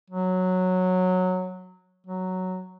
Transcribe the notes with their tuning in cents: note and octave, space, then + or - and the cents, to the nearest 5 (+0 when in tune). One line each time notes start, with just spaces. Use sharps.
F#3 -10
F#3 +0